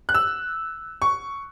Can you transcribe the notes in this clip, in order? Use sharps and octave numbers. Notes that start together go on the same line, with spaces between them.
F#6
E6
C#6